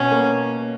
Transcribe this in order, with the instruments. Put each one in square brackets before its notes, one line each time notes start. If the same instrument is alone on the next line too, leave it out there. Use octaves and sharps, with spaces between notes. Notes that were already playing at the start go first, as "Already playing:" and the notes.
Already playing: [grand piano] B2 [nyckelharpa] C#4
[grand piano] A#3